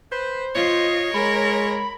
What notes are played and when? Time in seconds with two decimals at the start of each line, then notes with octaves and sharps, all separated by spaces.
0.12 B4 C5
0.55 F4 C#5 D#5
1.14 G#3 A#4 B5